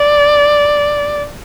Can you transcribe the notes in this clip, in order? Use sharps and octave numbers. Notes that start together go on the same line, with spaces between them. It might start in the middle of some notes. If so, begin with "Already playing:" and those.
Already playing: D5